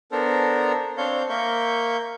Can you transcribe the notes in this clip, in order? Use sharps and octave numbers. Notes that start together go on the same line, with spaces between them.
B3 D4 A4 A#4 C5 A#5
C4 D4 C5 C#5 F5 G6
A#3 A#4 E5 C#6 G6